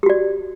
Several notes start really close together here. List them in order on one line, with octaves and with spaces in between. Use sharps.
G4 F#4 D5